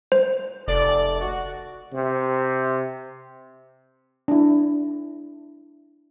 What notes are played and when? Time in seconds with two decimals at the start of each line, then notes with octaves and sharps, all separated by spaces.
0.12 C5
0.68 F1 A4 D5
1.20 F#4
1.93 C3
4.28 D4 E4